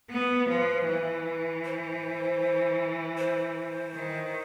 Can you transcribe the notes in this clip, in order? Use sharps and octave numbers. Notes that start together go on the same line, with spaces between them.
B3 B4
F3
E3
C5
C5
D#3